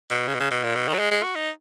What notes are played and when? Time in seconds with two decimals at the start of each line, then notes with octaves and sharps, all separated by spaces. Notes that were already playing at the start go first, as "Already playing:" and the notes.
0.10 B2
0.28 C#3
0.34 B2
0.40 C#3
0.51 B2
0.63 A#2
0.75 B2
0.88 D#3
0.94 F#3
0.99 G#3
1.11 G#3
1.23 F#4
1.35 D#4